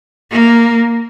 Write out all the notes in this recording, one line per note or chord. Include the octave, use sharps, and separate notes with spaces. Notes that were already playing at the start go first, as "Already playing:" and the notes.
A#3